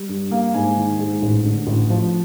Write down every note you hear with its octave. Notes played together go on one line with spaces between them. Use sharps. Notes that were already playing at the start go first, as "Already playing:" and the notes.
Already playing: G3
G2
A#3
G#2 G#5
D#3
G#2
A1
D3
A1
F3